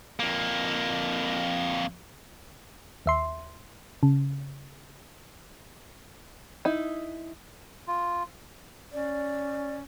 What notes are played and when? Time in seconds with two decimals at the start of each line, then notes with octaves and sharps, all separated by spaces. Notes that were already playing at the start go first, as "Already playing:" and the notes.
0.20 F2 A#3
3.06 D#2 E5 C6
4.03 C#3
6.65 D#4 E4
7.88 F4
8.93 C#4 D5